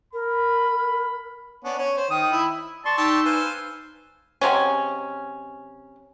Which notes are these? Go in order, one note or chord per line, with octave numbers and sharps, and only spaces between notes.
A#4 B5
B3 C#4 D4
C#4 C#5
C5
D#3 D#6
E4
D5 A5 C6 C#6
D#4 G4 A5 E6
B4 C5 F5 G#5
C3 F#3 G#3 C#4